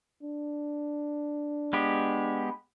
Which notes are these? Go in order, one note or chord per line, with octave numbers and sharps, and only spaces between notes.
D4
G#3 B3 G4